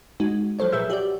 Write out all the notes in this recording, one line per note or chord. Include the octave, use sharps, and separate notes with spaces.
G#3 D#4 F#4
F3 F#3 A4 C5 C#5
A#2 G#4 B4 E5 E6 G6
F#4 G4 D5